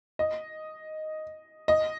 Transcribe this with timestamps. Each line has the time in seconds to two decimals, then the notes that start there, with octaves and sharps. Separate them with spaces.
0.19 D#5
1.68 D#5